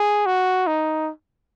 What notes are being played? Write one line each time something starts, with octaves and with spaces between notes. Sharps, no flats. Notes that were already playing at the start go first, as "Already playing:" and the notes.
Already playing: G#4
F#4
D#4